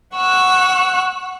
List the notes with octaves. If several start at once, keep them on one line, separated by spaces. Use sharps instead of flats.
F#5 C#6 E6 F#6